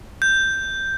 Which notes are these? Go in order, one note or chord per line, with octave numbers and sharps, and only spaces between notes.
G6